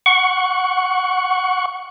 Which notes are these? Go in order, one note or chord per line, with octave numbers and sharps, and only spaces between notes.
F#5 C#6